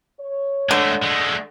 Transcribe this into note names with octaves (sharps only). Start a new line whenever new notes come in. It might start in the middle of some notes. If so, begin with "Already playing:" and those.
C#5
D3 G#3 A3
G#3 A3